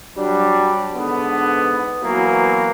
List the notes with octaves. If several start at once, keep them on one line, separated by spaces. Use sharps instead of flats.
F#3 G3 D4
G#2 D3 B3
E3 F#3 A#3 B3